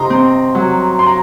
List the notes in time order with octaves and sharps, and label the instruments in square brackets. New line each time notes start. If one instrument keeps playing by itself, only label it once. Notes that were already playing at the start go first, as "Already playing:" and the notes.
Already playing: [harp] C3 D#4 [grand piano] A#5 C6
[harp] C4
F#3
[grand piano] C6
A#5